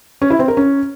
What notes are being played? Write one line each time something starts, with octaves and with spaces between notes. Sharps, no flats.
C#4
E4
C4
A#4
C#4